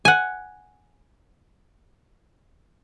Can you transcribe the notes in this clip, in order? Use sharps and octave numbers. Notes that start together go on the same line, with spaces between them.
F#5 G#5